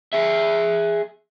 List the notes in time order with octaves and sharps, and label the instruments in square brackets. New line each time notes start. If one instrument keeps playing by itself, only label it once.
[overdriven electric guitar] G#4 E5